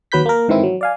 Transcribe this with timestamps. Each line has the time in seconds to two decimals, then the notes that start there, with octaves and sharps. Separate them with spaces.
0.12 D#2 F#3 B4 B5 G6 B6
0.26 A#3 A#4
0.48 G#2 D#3 E3 C4 E4
0.63 F#3
0.81 D5 F5 G#5